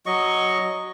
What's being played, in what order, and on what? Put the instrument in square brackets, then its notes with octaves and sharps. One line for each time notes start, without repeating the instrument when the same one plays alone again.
[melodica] F#3 D#5 C#6